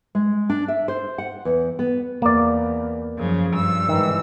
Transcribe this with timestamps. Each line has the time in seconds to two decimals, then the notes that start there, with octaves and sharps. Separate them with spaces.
0.15 G#3
0.50 D4
0.68 E5
0.88 C5
1.18 F#5
1.45 E2
1.79 B3
2.22 E2 A#3 D5
3.18 F#2 C#3 F3
3.51 G2 E6
3.89 G#2 D#3 E3